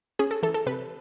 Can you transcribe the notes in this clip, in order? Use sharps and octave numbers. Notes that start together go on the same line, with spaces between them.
C#4 G#4
A4
E3 A4
A4
C3 B4